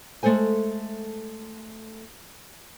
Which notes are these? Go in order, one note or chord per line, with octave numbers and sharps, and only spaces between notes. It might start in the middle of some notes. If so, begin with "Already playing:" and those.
G#3 A3 A4 C5 G#5